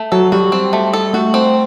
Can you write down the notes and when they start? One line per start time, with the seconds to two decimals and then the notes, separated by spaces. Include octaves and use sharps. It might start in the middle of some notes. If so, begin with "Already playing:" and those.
Already playing: A3
0.12 F#3 A4
0.32 G3 F#4
0.52 C4
0.73 A3
0.93 A4
1.14 A3 F#4
1.34 C4